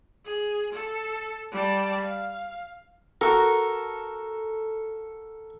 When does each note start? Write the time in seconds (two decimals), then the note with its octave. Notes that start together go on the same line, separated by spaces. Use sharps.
0.25 G#4
0.73 A4
1.52 G3 A5
2.01 F5
3.21 F#4 A4 A#4